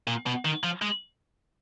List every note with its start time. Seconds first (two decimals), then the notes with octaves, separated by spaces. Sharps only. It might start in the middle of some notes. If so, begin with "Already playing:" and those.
0.07 A#2
0.26 B2
0.45 D#3
0.63 F3
0.82 G#3